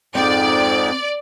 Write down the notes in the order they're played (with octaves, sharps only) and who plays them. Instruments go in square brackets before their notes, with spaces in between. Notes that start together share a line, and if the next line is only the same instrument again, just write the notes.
[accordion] F2 G#2 [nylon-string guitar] C4 G5 [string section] D5